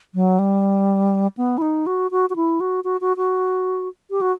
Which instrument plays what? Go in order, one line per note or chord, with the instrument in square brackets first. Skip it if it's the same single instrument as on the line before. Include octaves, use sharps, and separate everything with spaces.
[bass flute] F#3
G3
B3
E4
D#4
F#4
F#4
F#4
E4
F#4
F#4
F#4
F#4
G4
F#4